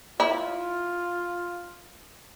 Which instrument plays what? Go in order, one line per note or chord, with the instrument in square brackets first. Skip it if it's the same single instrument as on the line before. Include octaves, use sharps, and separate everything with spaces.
[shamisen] E4 [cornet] F4